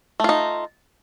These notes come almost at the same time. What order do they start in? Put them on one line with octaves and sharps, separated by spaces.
A3 F4 D#4